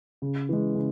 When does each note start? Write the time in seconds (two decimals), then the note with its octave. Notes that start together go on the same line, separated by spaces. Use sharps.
0.22 C#3
0.49 E3 G#3
0.75 C#3